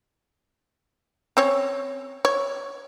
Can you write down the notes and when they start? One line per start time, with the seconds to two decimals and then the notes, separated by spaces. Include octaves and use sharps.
1.37 C4 C#4 C#5
2.25 C#5